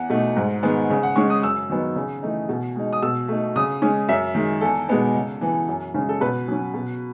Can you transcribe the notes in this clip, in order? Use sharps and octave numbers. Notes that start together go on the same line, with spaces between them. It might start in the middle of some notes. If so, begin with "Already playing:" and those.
Already playing: E2 F#5
B2 A3 D#4
G#2
D#3 G#3 B3 D#4
C#3
F#5
G#3 C#4 C#6
D#6
F#2 E6
D#3 F#3 B3 D#4
C#3
E3 A3 D#4
B2
G#3 D#4
D#6
B2 E6
A3 D#4
C#3 D#6
G#3 C#4
F#2 E5
D#3 G#3
E2 A4
B2 G#3 B3 D#4
C#3
E3 B3
F#2
C#3 G#3 C#4
A4
B2 B4
F#3 C#4
B2